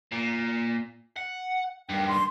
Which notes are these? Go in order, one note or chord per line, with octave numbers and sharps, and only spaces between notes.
A#2
F#5
G2 D#3 G5
C6